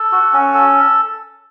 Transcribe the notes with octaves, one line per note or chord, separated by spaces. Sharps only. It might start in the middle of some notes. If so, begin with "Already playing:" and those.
Already playing: A4
F#4
C#4
A4